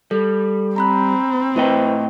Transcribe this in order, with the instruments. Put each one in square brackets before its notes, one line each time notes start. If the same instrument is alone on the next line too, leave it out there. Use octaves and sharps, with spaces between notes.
[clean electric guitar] G3 [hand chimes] A4
[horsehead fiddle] C4 [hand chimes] A#5 B5 F#6
[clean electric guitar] A2 D#5 G5 [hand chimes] E4 B4 C5